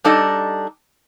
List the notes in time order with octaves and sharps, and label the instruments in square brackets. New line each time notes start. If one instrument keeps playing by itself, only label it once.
[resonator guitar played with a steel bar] G3 D4 D#4 A4 D#5